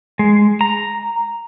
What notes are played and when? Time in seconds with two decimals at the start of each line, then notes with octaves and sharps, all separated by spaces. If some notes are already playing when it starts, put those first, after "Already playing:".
0.19 G#3
0.61 A#5